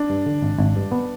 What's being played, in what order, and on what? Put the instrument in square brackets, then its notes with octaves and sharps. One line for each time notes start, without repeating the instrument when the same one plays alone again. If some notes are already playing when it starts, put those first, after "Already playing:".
Already playing: [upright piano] D4
[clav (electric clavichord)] G2
D3
G#1
G#1
G2
B3